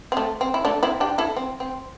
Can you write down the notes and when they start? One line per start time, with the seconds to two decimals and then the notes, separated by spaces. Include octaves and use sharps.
0.12 C4
0.17 A3
0.41 C4
0.54 E4
0.65 A3 D4
0.83 C4 E4
1.00 D4 G4
1.18 E4 A4
1.37 C4
1.60 C4